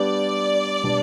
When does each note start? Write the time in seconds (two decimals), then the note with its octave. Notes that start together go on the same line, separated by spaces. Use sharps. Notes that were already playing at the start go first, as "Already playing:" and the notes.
Already playing: G3 B3 D4 G4 D5
0.83 B2 G3 D4